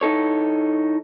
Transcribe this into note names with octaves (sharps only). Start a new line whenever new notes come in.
E3 D#4 A4 C#5